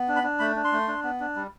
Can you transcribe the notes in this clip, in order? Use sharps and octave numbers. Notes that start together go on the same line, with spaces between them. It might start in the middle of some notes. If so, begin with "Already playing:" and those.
Already playing: B3
D4
B5
D4
A3 B5
D4
C6
A3
D4
B3
D4
G3